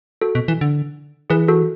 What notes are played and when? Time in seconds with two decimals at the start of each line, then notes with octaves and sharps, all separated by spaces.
0.21 F#4 A4
0.35 B2
0.48 E3
0.61 D3
1.30 E3 G#4 B4
1.48 F#4 A4